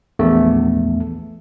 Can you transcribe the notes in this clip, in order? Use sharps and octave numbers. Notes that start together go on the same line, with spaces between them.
A#1 E2 A3